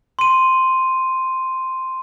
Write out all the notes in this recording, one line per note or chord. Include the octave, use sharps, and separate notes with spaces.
C6 D#7